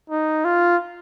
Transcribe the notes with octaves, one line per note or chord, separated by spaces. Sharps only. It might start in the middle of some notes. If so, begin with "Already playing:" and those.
D#4
F4